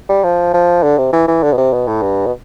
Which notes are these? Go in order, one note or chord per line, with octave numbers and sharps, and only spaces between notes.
G3
F3
F3
D3
C3
E3
E3
D3
B2
C3
B2
A2
G2
B2